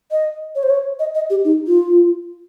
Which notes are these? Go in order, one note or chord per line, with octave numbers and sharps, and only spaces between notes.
D#5
C#5
C5
C#5
D#5
D#5
G4
D#4
F4